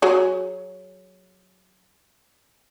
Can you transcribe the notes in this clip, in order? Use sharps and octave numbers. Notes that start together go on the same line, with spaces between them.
F#3 G#4